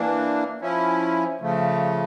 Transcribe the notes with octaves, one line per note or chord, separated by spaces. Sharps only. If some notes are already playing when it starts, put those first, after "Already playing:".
Already playing: E3 A#3 D4
F3 C#4 E4
C#3 F3 A3